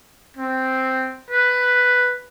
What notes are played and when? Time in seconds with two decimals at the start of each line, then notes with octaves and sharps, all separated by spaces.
0.37 C4
1.31 B4